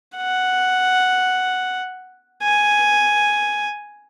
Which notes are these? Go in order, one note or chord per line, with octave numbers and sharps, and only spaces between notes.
F#5
G#5